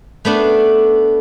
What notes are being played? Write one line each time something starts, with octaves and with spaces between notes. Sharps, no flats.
A3 B3 D4